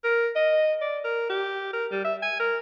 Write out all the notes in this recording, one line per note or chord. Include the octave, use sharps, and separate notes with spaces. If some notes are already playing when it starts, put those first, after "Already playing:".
A#4
D#5
D5
A#4
G4
A#4
G3
E5
G#5
A#4